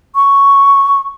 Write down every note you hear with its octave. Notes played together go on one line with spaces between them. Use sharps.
C#6